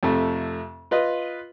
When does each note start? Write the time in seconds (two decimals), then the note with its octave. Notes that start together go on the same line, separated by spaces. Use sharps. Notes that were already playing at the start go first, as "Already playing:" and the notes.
0.03 F2 C3 A3
0.91 F4 B4 D#5